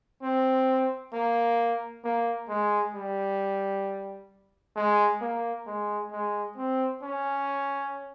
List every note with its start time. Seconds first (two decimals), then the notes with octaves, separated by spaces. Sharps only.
0.23 C4
1.13 A#3
2.04 A#3
2.49 G#3
2.95 G3
4.76 G#3
5.21 A#3
5.67 G#3
6.11 G#3
6.57 C4
7.03 C#4